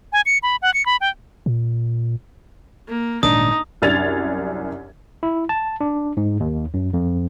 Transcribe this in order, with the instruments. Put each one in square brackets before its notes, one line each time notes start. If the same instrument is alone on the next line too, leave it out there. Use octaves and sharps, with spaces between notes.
[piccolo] G#5
C#7
B5
F#5
C#7
B5
G5
[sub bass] A#2
[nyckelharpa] A#3
[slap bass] G#1 A#2 G#3 [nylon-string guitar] D4 [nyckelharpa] D#4 [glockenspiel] D#6
[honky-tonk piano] C2 F#2 D4 G#6 A6 F7
[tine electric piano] E4
A5
D4
G#2
D#2
F#2
F2